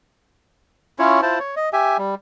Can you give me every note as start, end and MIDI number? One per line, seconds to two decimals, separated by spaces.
0.99 1.21 61
0.99 1.21 64
0.99 1.21 65
0.99 1.21 73
1.22 1.39 64
1.22 1.39 65
1.22 1.39 72
1.22 1.39 81
1.39 1.55 73
1.56 1.69 75
1.73 1.97 67
1.73 1.97 76
1.73 1.97 80
1.98 2.15 55